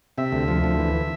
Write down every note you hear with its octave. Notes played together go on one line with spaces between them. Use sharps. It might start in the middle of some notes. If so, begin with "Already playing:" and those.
C3 E5
D2
F3
D2
E3